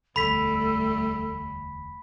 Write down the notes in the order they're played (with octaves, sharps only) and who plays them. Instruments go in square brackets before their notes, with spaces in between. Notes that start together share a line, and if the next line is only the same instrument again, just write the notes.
[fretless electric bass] E1 D2 [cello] G3 A3 [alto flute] A4 [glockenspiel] B5 B6